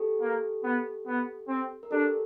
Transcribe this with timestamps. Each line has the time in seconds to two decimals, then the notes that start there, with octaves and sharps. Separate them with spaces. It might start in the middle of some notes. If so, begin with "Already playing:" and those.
Already playing: G4 A4
0.21 A#3
0.64 B3
1.07 B3
1.48 C4
1.83 A#4
1.91 D4 G4 A4